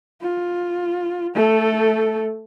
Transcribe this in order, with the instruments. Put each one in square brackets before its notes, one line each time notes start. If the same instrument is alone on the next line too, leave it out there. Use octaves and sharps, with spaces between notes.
[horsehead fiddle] F4
A3 A4